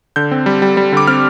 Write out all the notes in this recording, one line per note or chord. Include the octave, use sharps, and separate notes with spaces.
D3 G6
C4
G3
G3
G3
D3 D6
C4 F6